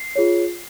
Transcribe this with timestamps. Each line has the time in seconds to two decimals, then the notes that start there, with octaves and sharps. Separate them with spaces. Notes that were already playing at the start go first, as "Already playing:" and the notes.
Already playing: C7
0.16 F4 G#4 C#5